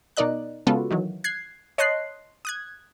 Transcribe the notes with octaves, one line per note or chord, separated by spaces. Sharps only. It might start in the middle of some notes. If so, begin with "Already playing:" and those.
B2 D#4 A#4 D5 D#5 F#6
C#3 G#3 B3 F4 F#4 A4
D#3 E3 F#3
F#6 G#6 C7
C#5 D#5 A5 C6 F#6 C7
D#6 F#6 G#6